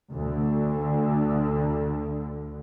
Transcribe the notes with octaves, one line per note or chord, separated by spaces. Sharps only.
D2 D3